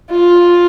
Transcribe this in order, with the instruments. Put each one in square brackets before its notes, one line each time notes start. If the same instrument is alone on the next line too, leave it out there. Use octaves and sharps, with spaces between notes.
[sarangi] F4